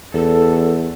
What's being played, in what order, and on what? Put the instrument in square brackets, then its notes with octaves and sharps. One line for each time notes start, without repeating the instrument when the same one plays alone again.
[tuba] E2 [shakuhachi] A4